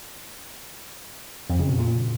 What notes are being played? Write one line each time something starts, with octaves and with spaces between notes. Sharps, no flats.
F2
C#3
B2
A#2